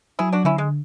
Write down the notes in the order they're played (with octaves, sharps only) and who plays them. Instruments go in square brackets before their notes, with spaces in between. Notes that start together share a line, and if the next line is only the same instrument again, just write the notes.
[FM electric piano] F#3 [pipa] E4 G#4
[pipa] D4 F#4
[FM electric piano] D3 [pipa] C#4 E4
[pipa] G#3